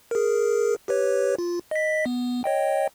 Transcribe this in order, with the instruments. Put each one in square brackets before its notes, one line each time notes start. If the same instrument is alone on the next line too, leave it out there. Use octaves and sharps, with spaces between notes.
[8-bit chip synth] G#4 A#4
G4 B4 C#5
F4
D#5 B6
B3
C#5 D#5 G5